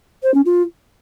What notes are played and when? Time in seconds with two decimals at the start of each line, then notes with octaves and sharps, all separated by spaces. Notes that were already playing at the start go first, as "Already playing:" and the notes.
0.23 C5
0.34 C#4
0.45 F4